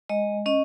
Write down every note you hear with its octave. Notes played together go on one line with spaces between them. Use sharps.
G#3 D#5
C#4 D#5